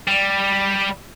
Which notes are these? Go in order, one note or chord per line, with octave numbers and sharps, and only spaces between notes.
G3